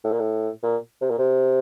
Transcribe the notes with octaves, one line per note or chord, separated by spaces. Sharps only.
A2
A#2
A2
A#2
C3
A#2
C3